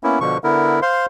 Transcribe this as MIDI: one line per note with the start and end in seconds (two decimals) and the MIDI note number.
0.03 0.19 58
0.03 0.19 59
0.03 0.19 61
0.03 0.19 64
0.21 0.38 47
0.21 0.38 50
0.21 0.38 53
0.21 0.38 85
0.44 0.80 50
0.44 0.80 59
0.44 0.80 64
0.44 0.80 70
0.82 1.06 72
0.82 1.06 77
0.82 1.06 84